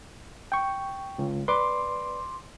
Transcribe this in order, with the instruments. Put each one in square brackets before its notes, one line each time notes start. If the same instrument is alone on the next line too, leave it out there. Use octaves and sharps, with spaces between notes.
[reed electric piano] G5 C#6
[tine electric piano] C#2
[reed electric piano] B4 D5 [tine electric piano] C6 D6